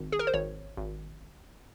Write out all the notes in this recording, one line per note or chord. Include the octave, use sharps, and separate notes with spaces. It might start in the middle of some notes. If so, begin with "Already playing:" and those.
Already playing: G#1
G#4
A#4
C5
G#1 C#5
G#1